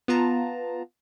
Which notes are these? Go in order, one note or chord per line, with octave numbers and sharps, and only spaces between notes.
B3 F4 A5 A#5